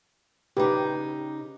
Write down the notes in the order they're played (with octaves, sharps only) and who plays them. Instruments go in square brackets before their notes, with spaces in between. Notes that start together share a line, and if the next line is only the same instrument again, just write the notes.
[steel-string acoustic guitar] C#3 D#4 [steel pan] G4 B4